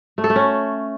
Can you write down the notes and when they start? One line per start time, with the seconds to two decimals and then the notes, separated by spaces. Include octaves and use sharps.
0.18 A3
0.24 A4
0.30 A3
0.36 C#4